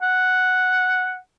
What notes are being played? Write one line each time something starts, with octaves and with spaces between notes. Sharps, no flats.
F#5